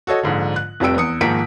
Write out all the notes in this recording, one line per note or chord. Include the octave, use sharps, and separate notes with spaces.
F#4 A4 C#5 D#5
A#1 G#2 D3
F#6
F1 F2 G3 G5 E6 D7
E2 D#6 C#7
G#2 D#3 F3 A#3 B6 D7